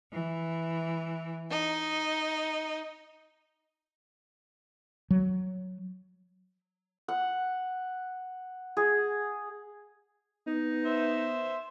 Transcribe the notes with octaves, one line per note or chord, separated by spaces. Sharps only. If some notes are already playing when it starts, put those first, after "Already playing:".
E3
D#4
F#3
F#5
G#4
B3 D#4
C5 E5